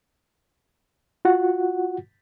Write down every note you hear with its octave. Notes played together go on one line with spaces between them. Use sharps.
F4 F#4 F#5